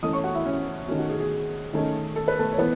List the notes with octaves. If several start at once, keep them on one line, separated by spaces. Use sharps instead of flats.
E3 A3 C#4 D#5 D#6
C#5 C#6
F#4 F#5
E4 E5
C#4 C#5
D#3 A3 C#4 F#4
F#4
G#4
G#4
D#3 A3 C#4
A4
B4
A3 A4
C#5
E3 B3 B4